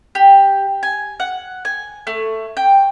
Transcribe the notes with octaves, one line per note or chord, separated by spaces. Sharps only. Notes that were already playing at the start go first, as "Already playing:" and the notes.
G4
G#5
F#5
G#5
A3
G5